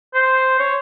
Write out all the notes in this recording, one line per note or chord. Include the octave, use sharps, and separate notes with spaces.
C5
C#5